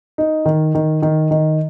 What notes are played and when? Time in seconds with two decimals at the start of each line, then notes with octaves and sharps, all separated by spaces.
0.18 D#4
0.45 D#3
0.75 D#3
1.02 D#3
1.31 D#3